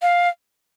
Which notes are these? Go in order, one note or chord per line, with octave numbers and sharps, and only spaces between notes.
F5